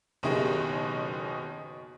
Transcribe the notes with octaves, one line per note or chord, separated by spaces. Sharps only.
F#1 B2 D#3 G4 G#4 D#5